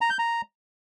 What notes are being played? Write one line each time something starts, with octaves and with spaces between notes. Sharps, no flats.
A#5
G6
A#5